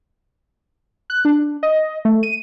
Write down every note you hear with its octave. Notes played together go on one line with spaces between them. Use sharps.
F#6
D4
D#5
A3
D#7